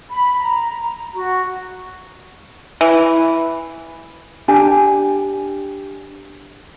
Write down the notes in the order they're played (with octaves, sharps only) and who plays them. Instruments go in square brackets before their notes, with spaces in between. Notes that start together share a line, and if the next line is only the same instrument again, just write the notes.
[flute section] B5
A#5
F#4
[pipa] E3
[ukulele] D4 G4 G#5